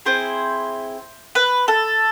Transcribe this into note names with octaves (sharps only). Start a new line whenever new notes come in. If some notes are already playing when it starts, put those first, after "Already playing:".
C4 E4 G#4 C5
B4
A4